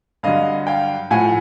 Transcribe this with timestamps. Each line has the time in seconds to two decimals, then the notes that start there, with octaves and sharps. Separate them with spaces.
0.23 G2 D3 F#3 D#5 F5
0.67 F5 G5
1.11 A2 F3 F#5 G#5